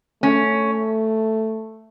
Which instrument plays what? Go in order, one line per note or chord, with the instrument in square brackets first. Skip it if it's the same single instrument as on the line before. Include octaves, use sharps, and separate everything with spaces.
[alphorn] A3 [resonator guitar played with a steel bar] C#4